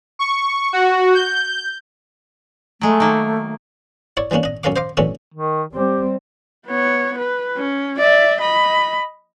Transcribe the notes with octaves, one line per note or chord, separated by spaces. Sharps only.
C#6
F#4
G6
F#3 G#3 A3
D#3 A#3
E4 C#5 D5 D6
E3 G3 A#3 C#4 D4
D4 D#5
F#2 C#4 A4 A#4 F5 D6
C5 D#5 F5 D6
E3 F#3 A3 C#4 D4 A4
D#3
G3 C4 G4
B3 C#5
B4
C#4
D5 E5
D#5 B5